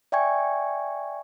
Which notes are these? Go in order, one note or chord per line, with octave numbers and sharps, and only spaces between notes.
D5 E5 G5 G#5 C#6 G#6